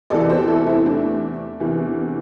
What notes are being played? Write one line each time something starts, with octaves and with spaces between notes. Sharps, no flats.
E2 C3 E3 A4 D5
G4 C5
E4 A4
C4 E4
A3 D4
E2 C3 E3